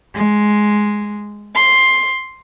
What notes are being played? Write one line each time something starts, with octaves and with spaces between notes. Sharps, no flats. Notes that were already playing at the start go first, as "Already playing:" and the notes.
G#3
C6